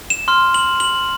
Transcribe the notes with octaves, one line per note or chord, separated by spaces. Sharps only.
E7
C6 F6
F#7
F#7